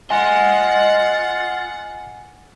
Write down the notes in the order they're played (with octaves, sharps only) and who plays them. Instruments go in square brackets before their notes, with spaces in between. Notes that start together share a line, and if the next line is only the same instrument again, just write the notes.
[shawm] F4 [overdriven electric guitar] D#5 C6 [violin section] F#5 [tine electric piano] G#5